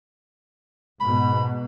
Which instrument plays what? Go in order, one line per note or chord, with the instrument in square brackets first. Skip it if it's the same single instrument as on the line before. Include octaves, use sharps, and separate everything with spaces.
[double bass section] G#2 B2 [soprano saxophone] B5